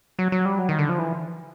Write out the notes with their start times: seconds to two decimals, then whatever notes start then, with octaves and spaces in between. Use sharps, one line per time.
0.19 F#3
0.32 F#3
0.45 G3
0.59 F#3
0.69 D#3
0.79 D3
0.89 F3
0.99 E3